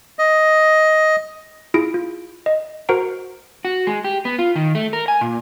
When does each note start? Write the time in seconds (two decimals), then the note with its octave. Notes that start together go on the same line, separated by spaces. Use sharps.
0.19 D#5
1.74 E4 F4 G#4 A#6 D7
1.94 F4
2.46 D#5
2.89 F#4 A#4 C5 F#5 A#5 D7
3.65 F#4
3.87 G#3
4.04 G4
4.25 B3
4.39 F4
4.56 D#3
4.75 A3
4.93 A#4
5.08 G#5
5.21 A#2